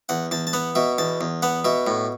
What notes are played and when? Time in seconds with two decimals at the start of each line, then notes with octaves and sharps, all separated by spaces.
0.09 E2 F#5
0.31 E2 A5
0.47 A5
0.53 B3 F#5
0.75 B2 E5
0.98 E2 A5
1.21 E2
1.42 B3 F#5
1.65 B2 E5
1.87 A2